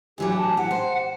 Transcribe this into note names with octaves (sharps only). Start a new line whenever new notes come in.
D2 E3 F#3 G4
A5
G4 F#5
C5